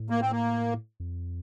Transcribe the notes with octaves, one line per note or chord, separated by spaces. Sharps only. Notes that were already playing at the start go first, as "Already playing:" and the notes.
Already playing: A2
A#3
C4
A#3
F2